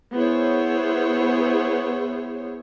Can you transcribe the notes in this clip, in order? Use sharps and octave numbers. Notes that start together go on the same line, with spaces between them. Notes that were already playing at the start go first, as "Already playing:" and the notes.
B3 E4 G#4 C5 C#5